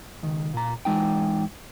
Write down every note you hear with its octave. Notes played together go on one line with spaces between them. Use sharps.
C#2 D#3
A#2 A#5
E3 G#3 D#4 G5